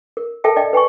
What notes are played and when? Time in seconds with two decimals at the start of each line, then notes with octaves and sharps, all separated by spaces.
0.17 A#4
0.44 A4 A#4 E5 G5 A5
0.56 D5 D#5 G5
0.73 B4 G5 G#5 C#6